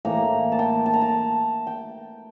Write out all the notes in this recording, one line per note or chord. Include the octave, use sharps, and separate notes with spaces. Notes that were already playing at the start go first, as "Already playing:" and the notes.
A2 E3 A#3 A#5
A5
G5
A5
A#5
A5
G5